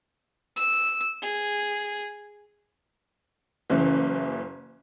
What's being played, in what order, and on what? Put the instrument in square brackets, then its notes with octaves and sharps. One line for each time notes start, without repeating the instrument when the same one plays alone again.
[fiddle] E6
G#4
[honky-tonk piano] F#1 C#3 E3